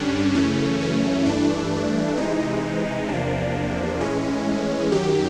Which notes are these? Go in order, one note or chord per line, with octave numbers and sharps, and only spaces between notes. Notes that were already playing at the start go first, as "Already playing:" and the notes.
Already playing: G2 D3 G3 C#4 D4
F#2 C#3 E3 A3 C#4
C#4
G2 E3 A3 D4
C3 E3 G#3 D#4
E2 C3 F3 A#3 D4
A2 E3 G#3 C#4
F#2 D#3 F#3 G4